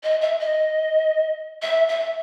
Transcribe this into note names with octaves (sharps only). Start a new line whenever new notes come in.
D#5
E5
D#5
E5
E5